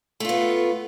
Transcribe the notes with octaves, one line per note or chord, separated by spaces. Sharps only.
A3 B3 F4